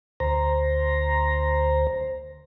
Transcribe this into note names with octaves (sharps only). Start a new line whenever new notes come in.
D2 C5 A#5